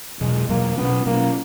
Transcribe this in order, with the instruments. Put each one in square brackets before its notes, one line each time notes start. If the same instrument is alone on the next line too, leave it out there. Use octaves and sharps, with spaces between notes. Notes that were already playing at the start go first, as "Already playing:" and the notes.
[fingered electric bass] E2 B2 F#3 [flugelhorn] G#3
[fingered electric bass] E2 B2 F#3 [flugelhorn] A#3
[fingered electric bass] B2 F#3 C#4 [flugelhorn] B3
[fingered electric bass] B2 F#3 C#4 [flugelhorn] A#3